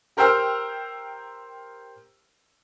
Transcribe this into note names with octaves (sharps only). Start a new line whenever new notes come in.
G4 A#4 C5 G5 E6 F6